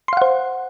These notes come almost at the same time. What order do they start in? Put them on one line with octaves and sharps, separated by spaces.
C6 F5 F#5 C5